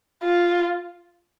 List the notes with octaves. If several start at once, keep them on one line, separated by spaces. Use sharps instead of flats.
F4